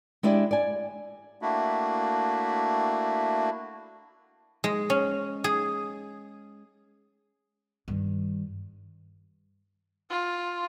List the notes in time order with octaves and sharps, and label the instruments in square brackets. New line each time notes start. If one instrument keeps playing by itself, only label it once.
[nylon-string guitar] G#3 D4 E4 G4 D5
D5 G#5
[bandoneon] A3 A#3 D4 E4 F#4
[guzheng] G#3
C#4
G#4
[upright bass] G2 D#3
[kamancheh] F4